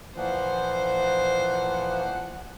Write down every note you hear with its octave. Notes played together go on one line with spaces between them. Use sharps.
A#2 E3 F3 C5 F#5